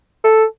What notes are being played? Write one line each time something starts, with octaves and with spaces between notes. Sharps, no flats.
A4